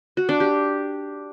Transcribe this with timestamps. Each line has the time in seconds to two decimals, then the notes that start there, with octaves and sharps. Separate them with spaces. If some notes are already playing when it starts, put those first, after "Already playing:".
0.17 F#4
0.29 D4
0.40 G4